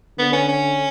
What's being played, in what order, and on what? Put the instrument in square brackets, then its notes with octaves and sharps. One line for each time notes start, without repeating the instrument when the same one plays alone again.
[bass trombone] D3 [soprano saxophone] B3
[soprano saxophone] C#4
C#4